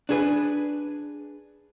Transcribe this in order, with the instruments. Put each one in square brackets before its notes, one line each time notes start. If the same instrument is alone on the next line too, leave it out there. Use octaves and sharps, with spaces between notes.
[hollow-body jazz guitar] D4 G#4 B4